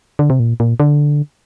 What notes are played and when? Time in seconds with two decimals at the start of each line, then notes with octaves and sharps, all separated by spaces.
0.19 D3
0.30 C3
0.40 A#2
0.60 A#2
0.80 D3